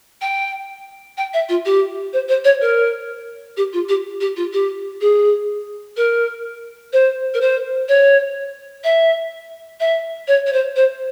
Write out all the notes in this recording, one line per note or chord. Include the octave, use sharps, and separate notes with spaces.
G5
G5
E5
F4
G4
C5
C5
C#5
A#4
G4
F4
G4
G4
F4
G4
G#4
A#4
C5
A#4
C5
C#5
E5
E5
C#5
C#5
C5
C5